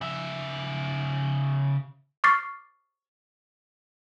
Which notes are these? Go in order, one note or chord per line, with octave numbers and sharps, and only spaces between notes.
C#3 E5
C#6 D6 F6 A6 C7